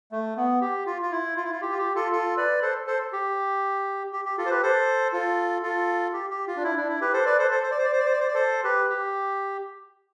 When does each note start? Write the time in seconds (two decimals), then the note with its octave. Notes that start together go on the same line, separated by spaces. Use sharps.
0.12 A3
0.37 B3
0.61 G4
0.86 F4
1.02 F4
1.12 E4
1.37 F4
1.44 E4
1.52 F4
1.62 G4
1.71 F4
1.78 G4
1.95 F4 A4
2.12 F4 A4
2.37 B4 D5
2.62 A4 C5
2.87 A4 C5
3.13 G4
4.13 G4
4.25 G4
4.38 F4 A4
4.46 C5
4.50 G4 B4
4.63 A4 C5
5.13 F4 A4
5.63 F4 A4
6.13 G4
6.30 G4
6.47 F4
6.56 D4
6.64 E4
6.77 D4
6.89 E4
7.01 G4 B4
7.13 A4 C5
7.26 B4 D5
7.39 A4 C5
7.51 A4 C5
7.63 C5
7.71 D5
7.78 C5
7.84 D5
7.92 C5
8.00 D5
8.06 C5
8.13 D5
8.20 C5
8.28 D5
8.34 A4 C5
8.64 G4 B4
8.90 G4